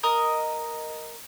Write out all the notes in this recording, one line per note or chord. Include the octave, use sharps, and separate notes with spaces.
A#4 D#5 D#6